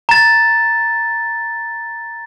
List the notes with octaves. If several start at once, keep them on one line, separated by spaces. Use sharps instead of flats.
A#5 A6